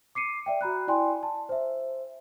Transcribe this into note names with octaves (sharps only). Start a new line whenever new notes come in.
D6 C7 C#7 D#7
D5 E5 G5
F#4 A#5 B5 F#6
E4 D5 G5 G#5 C6
A5
C5 E5